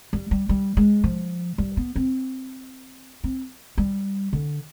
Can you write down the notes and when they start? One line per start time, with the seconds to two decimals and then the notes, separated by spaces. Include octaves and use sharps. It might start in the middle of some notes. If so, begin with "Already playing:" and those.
0.13 G3
0.31 G3
0.49 G3
0.77 G#3
1.04 F3
1.58 G3
1.77 B3
1.96 C4
3.24 C4
3.78 G3
4.33 D3